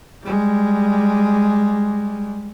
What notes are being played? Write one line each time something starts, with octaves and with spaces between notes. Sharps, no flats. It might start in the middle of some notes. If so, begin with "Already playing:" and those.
G3 G#3